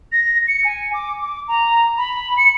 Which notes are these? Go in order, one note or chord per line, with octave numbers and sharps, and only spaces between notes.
A#6
C#7
G#5
D6
D6
A#5
B5
C#7